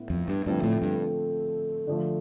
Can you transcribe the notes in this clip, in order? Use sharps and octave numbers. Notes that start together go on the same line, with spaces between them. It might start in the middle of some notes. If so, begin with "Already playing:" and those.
Already playing: A2 B3 E4
F2
G2
G2 D3 F3 A3 C4
A2
G2
D3 F3 A3